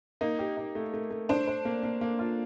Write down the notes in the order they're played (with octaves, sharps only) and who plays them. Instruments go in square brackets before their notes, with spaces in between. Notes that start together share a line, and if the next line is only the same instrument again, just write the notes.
[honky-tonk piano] A#3 [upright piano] D#4
[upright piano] G4
D#4
A3
A3
A3
[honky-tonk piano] D4 [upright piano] C5
[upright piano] C5
A#3
A#3
A#3
F4